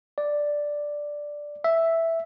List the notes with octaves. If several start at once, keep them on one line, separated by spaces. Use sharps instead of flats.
D5
E5